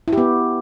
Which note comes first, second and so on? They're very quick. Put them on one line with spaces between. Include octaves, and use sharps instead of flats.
E4 G4 B3